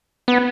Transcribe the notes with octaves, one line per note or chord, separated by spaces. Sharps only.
B3